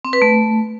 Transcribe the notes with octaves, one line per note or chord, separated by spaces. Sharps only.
C4
B4
A3